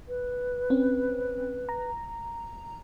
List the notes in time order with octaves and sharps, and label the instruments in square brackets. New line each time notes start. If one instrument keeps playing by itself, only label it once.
[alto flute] B4
[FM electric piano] C4 C#4
A#5